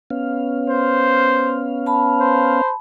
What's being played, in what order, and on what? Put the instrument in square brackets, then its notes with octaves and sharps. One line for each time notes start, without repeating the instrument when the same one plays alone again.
[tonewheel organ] B3 C#4 F5
[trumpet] C5
[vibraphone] A5 B5
[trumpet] C5